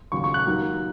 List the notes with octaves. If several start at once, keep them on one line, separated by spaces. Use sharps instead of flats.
D#2 C#3 F#3 C#6
C#6
F#6
D#2 D#3 F#3